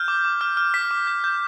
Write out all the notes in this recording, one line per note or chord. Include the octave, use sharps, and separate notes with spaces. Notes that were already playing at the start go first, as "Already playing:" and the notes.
Already playing: F6 G6
D6
D6
F6
F6
D6 B6
D6
G6
G6